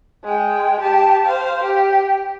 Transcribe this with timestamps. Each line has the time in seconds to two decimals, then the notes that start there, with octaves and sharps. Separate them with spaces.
0.24 G#3 G5
0.81 G4 A5
1.25 C5 F5
1.63 G4